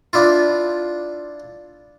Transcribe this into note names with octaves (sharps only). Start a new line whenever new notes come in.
D4 E4 F4